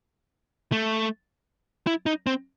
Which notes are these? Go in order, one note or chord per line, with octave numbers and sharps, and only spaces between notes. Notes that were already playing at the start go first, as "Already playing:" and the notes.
A3
E4
D#4
C4